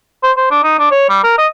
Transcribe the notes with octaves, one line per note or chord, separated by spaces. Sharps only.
C5
C5
D4
D#4
D4
C#5
G3
A#4
D#5